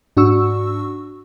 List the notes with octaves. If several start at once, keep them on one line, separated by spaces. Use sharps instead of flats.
G#2 D4 F#4 C#6 E6